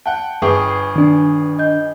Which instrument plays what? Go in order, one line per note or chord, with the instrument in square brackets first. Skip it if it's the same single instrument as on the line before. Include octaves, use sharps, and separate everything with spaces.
[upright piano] F#5 G5 [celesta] A5
[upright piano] G1 G#4 G5 [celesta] B4 C#6 D#6
[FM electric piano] D#3 D4
[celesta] D#5 G6